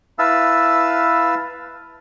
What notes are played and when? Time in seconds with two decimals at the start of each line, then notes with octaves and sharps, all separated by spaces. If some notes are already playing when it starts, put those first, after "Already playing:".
0.19 E4 B4 E5 F5 A5 E6